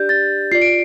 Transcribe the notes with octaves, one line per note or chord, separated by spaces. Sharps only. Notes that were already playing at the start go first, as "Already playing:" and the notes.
Already playing: D4 G4 D5 G6
A6
F4 D5 C7
D7